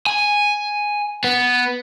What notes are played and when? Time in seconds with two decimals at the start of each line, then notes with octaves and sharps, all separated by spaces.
0.07 G#5
1.24 B3